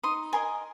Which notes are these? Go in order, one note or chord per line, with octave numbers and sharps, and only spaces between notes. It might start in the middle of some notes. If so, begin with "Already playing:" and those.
D#4 C6 D#6
A#4 D#5 G#5 C6